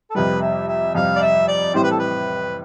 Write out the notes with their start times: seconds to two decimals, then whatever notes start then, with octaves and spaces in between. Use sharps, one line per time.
0.10 A4
0.15 F2 C3 G3 B4
0.41 E5
0.68 E5
0.95 F2 C3 G3 F5
1.15 D5
1.21 E5
1.48 D5
1.74 A2 E3 G3 C4 G4 C5
1.83 B4
1.90 A4
1.99 B4